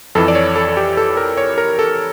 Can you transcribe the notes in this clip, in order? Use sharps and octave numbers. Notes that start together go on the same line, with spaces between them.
F2 E3 A4
D5
C#5
A4
A4
G4
A4
A#4
C#5
A#4
A4